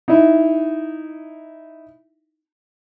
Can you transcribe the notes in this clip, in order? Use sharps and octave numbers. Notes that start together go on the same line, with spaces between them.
D#4 E4